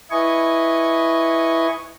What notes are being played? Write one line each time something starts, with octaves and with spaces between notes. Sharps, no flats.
E4 B4 D#5 G#5 C#6